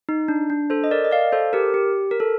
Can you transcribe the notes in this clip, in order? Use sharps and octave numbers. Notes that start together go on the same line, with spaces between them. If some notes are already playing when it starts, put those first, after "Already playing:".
D#4
D4
D4
A4 C5
D#5
A#4 D5
D#5
D5 F5
A4 C5
G4 A#4
G4
A#4
A4